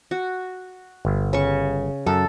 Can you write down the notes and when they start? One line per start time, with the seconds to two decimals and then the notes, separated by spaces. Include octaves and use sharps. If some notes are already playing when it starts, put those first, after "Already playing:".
0.11 F#4
1.05 G1
1.33 C#3 C#6
2.06 F#2 A4